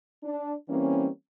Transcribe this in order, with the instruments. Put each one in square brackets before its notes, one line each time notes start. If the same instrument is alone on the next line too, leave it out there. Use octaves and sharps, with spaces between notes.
[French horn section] D4
E3 G3 A#3 C4 C#4